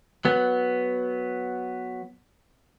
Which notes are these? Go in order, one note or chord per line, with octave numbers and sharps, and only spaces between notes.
F#3 B3